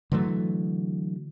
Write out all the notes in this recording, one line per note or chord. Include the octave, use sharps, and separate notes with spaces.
D3 E3 F#3 A3